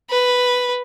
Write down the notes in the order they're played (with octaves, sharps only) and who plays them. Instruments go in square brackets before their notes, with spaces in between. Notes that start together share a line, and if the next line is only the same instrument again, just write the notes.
[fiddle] B4